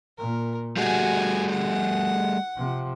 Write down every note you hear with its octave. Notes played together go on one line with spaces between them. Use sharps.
A#2 A#4
D3 G3 A3 F#4 G#4 G#5
F#5
C3 F3